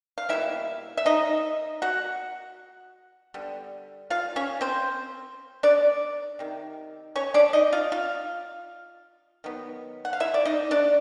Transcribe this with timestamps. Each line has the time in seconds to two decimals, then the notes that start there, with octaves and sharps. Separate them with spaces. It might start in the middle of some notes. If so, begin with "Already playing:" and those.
0.18 F5
0.29 B2 G3 A#3 E4 E5
0.97 E5
1.06 D#4 D#5
1.82 F#4 F#5
3.34 D3 G3 B3
4.10 F4 F5
4.36 C#4 C#5
4.61 C4 C5
5.63 D4 D5
6.39 C3 D#3
7.16 C#4 C#5
7.34 D4 D5
7.53 D#4 D#5
7.72 F4 F5
7.92 F4 F5
9.44 D#3 F#3 B3
10.05 F#5
10.13 F5
10.20 E4 E5
10.34 D5
10.45 D#4 D#5
10.71 D4 D5